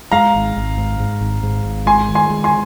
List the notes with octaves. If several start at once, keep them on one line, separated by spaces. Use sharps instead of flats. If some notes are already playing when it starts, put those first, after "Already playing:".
G#3 F5 A#5
G#1
G#1
G#2
G#2
G#1
G#2
G#1
G#3 G#5 C6
D#3
G#5 C6
G#3
G#5 C6